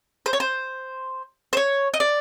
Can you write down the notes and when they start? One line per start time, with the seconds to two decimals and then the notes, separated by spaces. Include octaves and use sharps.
0.26 C5
0.33 C#5
0.40 C5
1.53 C5
1.57 C#5
1.94 D#5
2.00 D5